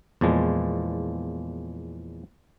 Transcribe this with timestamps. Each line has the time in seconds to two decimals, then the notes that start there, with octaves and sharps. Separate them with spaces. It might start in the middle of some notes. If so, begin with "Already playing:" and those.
0.21 E2 A#2 F3 G#3